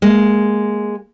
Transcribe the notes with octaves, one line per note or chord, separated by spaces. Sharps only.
G#3 A#3